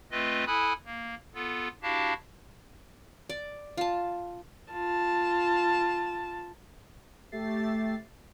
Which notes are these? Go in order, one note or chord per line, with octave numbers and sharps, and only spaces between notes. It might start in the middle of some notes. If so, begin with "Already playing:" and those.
A3 C4 F4 B4 D#5
E4 A4 G#5 B5 D#6 F#6
A#3
B3 F4 A4
D4 E4 F#4 G4 F5 A5
D5
F4 A5
F4 A5
A3 G4 E5 A6 C7